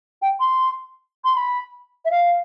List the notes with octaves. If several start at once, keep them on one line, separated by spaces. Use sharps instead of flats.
G5
C6
C6
B5
E5
F5